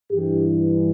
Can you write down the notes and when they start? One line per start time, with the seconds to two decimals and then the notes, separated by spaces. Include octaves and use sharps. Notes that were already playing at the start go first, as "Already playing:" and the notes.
0.11 G2 E3 G4